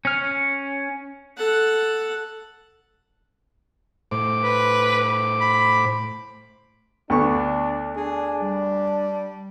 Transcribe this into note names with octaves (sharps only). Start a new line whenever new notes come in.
C#4 F6
A4 F#5
A2 C5 D6
B4
B5
D2 B3 D4 C#6
D4 G#4
G3